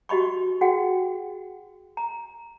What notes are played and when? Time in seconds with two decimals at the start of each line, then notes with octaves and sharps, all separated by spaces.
0.09 F#4 G4 D#5 B5 C#6
0.61 F#4 G#4 F#5 G5
1.97 A#5